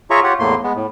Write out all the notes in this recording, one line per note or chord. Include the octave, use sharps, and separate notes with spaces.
F4 G#4 C#5 E5 A#5 C#6
F4 G4 C#5 F#5
E2 A2 A3 A#3 C6
G#3 B3
A2